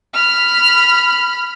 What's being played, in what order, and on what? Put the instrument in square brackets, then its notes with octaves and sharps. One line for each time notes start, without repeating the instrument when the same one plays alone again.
[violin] B5 F6